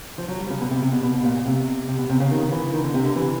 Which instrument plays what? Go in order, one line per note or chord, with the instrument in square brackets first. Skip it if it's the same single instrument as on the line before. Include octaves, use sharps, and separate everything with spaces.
[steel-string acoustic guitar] F3
F#3
G3
C#3
B2
C3
C3
B2
B2
B2
A#2
A#2
C3
C3
B2
C3
C#3
D#3
E3
D#3
D3
C3
D3
E3